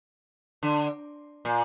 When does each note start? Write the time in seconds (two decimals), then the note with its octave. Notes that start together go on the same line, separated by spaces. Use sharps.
0.63 D3
1.45 A#2